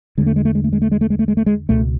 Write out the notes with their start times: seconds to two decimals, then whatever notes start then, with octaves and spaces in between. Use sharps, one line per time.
0.18 E2 D3 G#3
0.26 A3
0.36 G#3
0.45 A3
0.55 G#3
0.64 A3
0.73 G#3
0.82 A3
0.91 G#3
1.01 A3
1.10 G#3
1.19 A3
1.28 G#3
1.37 A3
1.46 G#3
1.69 C#2 B2 A3